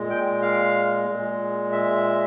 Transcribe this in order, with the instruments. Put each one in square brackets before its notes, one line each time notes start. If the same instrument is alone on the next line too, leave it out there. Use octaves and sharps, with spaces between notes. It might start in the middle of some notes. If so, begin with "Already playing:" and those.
Already playing: [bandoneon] A#2 G#3
G5
F5
A#2 G#3
E5